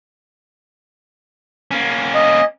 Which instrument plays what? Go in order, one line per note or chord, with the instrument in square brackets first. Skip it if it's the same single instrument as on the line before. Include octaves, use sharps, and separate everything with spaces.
[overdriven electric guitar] A#3 C#4
[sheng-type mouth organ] D#5